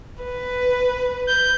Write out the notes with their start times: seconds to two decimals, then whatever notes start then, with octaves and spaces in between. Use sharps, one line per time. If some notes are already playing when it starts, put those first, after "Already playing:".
0.24 B4
1.27 G6